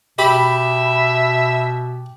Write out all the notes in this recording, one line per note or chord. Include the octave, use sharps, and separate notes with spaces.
B2 G4 E5 B5